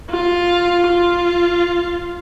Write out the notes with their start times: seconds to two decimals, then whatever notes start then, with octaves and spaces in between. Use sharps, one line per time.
0.10 F4
0.88 F4